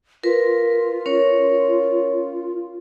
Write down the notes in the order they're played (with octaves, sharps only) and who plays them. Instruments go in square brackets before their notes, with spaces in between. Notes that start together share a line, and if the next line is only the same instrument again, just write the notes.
[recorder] F4 [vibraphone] A#4 B4
[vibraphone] C#4 A#4 C#5